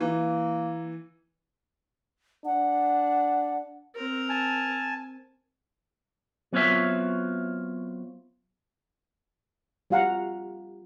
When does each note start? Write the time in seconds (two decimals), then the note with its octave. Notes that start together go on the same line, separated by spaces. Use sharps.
0.01 E3 A#3
2.45 D4 F#5
3.95 C4 A#4
4.29 G#5 A5
6.53 F#3 B3 C4 F4 C#5 E5
9.90 G3 F4 F5 F#5 A#5